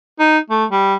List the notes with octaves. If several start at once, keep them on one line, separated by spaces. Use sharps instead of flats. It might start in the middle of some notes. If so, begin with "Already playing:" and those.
D#4
A3
G3